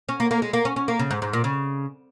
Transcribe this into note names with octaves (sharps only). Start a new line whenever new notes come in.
C#4
A#3
A#3
G#3
A#3
C#4
C#4
A#3
C#3
G#2
G#2
A#2
C#3